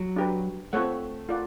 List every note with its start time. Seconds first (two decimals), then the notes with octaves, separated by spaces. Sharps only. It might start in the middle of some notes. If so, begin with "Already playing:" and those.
Already playing: F#3
0.16 D4 G4 B4
0.73 A3 C4 F4 A4 C#5 F#5
1.29 F4 A#4 D5 F#5